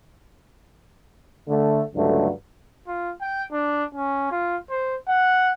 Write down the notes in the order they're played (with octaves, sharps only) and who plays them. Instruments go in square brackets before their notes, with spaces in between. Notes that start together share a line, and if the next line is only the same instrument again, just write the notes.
[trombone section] D3 A3
C#2 G2 D3 F#3 A3
[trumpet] F4
G5
D4
C#4
F4
C5
F#5